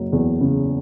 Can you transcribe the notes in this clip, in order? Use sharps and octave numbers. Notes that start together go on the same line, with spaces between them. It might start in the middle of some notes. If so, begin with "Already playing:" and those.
Already playing: F#1 F#3
E2
C#3